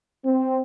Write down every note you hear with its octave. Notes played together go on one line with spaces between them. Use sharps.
C4